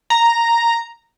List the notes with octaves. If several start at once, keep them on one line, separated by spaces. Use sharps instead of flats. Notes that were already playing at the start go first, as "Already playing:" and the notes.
A#5